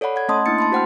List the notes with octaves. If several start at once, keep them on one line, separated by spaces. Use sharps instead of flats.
A4 C#5 D5 F#5 B5
F#5 G#6
A3 C#4 D#5 A5 C6 D#6
A3 A#3 D4 E4 A6 C#7
A5 B5 C6
F#4 C5 F#5 G5 F6